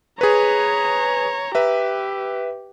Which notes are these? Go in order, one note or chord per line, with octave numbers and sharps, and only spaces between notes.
G#4 B4 C#5 A#5
G4 B4 E5